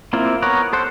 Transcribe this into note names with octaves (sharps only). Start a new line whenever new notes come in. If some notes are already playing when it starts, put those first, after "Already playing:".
A#3 C4 E4 F4
B3 A#4 C#5 F#5
A4 C5 F#5